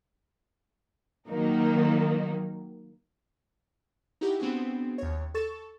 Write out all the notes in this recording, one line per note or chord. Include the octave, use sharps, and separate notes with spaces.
D#3 F#3 A#3 D#4
D#4 E4 F#4 G4
B3 C4 D4 F#4 G#4
D#2 C#5
A4 C#6 A6 E7